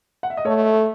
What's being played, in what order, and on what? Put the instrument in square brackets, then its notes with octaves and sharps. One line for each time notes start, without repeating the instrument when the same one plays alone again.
[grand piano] F#5
E5
D#5
[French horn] A3 [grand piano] A4 C#5